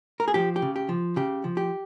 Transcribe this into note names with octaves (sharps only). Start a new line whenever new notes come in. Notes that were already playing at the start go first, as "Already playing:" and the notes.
A#4
G#4
F3 G4
G4
C#3
G4
F3
C#3 G4
F3
G4